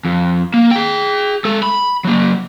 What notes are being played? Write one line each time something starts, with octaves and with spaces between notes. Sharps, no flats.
F2
A#3
G#4 G5
G#3 A4
B5
F#3 A#3